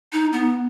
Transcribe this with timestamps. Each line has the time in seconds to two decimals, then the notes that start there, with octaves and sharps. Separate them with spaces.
0.13 D#4
0.33 B3